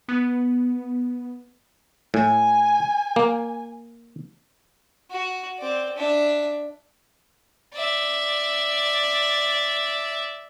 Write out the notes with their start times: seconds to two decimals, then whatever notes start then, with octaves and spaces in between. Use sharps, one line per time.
0.09 B3
2.14 A2 G#5
3.16 A#3
5.11 F#4
5.58 C4 D5
5.96 D4 E5
7.74 D5 E5